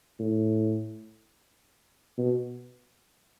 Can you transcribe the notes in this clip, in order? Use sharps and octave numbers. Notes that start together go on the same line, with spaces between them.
A2
B2